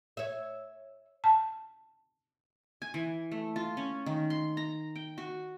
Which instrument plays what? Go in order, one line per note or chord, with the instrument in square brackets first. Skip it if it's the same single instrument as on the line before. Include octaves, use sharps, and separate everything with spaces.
[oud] C#5 E5
[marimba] A5
[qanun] G#5
E3
A3
F4
C#4
D#3
C6
A#5
G5
F#4